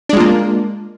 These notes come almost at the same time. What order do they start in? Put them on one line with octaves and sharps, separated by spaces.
D4 G#3 F4 A#3